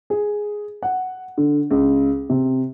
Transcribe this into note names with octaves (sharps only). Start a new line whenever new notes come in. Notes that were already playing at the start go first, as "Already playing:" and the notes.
G#4
F#5
D3
C#2
C3